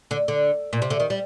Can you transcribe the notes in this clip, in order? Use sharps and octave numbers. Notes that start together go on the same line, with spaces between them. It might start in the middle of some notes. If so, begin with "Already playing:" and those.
D3
D3
A#2
C3
D3
D#3
G3